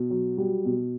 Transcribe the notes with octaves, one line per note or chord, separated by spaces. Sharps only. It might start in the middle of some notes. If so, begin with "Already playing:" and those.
Already playing: B2
F#3
G3 F#4
B2